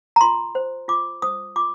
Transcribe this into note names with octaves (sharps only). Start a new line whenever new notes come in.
A#5
F4 C6
C5
F4 D6
C5 D#6
F4 D6